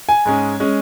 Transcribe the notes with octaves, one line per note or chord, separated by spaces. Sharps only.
G#5
G#2 G#3 C#4
G#3 C#4